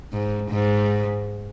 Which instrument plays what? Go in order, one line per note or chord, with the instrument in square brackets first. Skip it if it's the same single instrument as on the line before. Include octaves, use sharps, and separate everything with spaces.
[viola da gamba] G#2
G#2